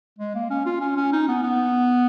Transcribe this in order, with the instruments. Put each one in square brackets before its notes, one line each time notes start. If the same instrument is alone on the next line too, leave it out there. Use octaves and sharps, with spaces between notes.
[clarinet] G#3
A#3
C#4
F4
C#4
C#4
D#4
B3
B3